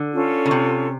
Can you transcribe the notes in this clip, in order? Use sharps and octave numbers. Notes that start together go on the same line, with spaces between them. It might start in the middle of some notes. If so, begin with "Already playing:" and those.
Already playing: D3
C#4 F4 A4
C#3
C3